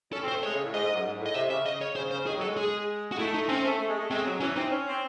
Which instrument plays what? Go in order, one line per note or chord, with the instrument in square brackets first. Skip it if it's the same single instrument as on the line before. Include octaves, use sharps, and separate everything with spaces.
[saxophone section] C#4 [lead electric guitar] A4
[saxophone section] C4
[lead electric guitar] C5
[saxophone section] A3
[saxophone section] G#3 [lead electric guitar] C#5
[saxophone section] C#3
A2
[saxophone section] G#2 [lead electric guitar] D#5
[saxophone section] G#2
F#2
G#2
A2
[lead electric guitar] D#5
[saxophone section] C3 [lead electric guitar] E5
[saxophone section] C#3 [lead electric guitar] E5
[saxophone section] C#3 [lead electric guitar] D#5
[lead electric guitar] C#5
[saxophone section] C#3 [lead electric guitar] C5
[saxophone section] C#3 [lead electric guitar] C5
[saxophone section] D#3 [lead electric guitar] G#4
[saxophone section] F#3 [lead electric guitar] A4
[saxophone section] G#3
[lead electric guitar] G#4
F#4
[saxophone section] A3 [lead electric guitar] E4
[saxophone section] A3 [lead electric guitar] D#4
[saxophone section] C4 [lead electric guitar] C#4
[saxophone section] A3
A3
G#3
A3
[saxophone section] G#3 [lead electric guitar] C4
[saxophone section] F#3
[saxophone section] E3 [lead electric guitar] C#4
[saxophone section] C4 [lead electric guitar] D#4
[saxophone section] C#4
C4